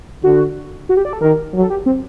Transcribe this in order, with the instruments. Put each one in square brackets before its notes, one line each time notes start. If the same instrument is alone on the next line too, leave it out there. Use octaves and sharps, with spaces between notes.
[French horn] D3 [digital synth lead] F#4
[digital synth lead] F#4
G4
D5
A4
[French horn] D#3 [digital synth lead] A#4
[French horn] F#3
[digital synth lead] A4
G4
C4